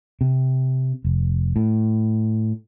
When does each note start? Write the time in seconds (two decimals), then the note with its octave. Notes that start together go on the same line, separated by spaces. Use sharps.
0.21 C3
1.05 F1
1.56 A2